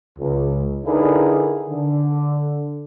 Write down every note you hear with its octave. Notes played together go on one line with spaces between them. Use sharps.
C#2
D3 D#4 E4 G#4 A#4 B4
D3